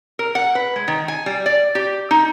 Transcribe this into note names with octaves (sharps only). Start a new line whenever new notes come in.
A#4
F#5
B4
G#3
D#3
G#5
G3
D5
G4
D#4